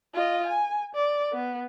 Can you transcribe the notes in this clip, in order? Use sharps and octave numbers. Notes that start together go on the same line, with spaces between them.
F4 D#5
G#5
D5
B3